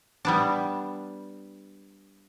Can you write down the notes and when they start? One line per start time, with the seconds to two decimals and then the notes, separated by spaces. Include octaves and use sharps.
0.25 G3 B3 D4